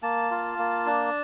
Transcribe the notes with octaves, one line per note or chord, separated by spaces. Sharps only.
A#3 A5
F4
A#3
D4